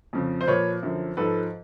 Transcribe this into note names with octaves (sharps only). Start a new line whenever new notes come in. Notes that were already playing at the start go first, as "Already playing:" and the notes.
F2 C#3 F3
C5
A#2 F3 B4 C#5
F#2 D3 F3
G#2 F3 A4 B4